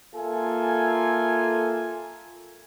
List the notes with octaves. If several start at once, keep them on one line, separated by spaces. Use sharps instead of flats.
A#3 F4 A4 E5 G#5